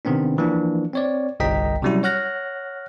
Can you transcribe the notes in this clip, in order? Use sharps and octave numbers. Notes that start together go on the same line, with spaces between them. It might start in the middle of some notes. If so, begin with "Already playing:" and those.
C3 D#3 B3 C4 D4
E3 F3 A#3 D4
C4 C#5 D5
G1 C2 D#5 G5 A#5 B6
C3 F#3 G3 C#4 E4 F#4
C#5 F#5 F6 F#6 A#6